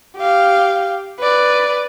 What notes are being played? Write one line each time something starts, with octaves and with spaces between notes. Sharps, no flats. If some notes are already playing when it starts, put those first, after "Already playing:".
G4 F5
B4 D5